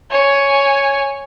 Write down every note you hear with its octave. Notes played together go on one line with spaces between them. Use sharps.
C#5 G#5